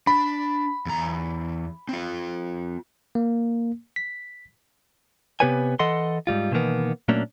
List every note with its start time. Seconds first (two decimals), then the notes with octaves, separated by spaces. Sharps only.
0.07 D4 B5
0.86 E2 A#5
1.89 C4 F4
3.15 A#3
3.96 B6
5.40 C3 B3 G4 B4 C#5 G#5
5.79 E3 A4 D#5 F#5 C6
6.27 G#2 C3 G3 F4
6.52 B2 D#3 E3 A#3 B3
7.08 A#2 F#3 A3 A#3 C#4 D4